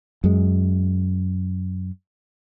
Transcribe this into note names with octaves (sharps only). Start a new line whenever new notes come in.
F#2 G#3